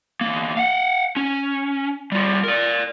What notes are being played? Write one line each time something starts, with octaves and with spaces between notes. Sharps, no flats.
E2 A#3
F5 F#5
C#4
G3 F4
A#4 D5